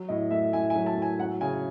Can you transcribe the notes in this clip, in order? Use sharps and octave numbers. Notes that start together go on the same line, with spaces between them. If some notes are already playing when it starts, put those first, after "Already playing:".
Already playing: F#3
A2 D#5
A3 E5
A2 G#5
G#5
F#3
A5
A2 G#5
F#3 F#5
C#3 G#5